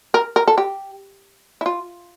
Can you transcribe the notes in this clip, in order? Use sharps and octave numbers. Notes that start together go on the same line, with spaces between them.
A#4
A#4
A4
G4
E4
F4